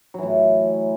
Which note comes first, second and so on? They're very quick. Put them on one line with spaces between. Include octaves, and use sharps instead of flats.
F#3 E3 A2